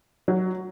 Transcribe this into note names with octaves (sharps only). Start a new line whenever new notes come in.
F#3